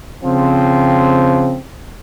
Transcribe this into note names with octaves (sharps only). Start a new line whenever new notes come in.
C#3 F3 C4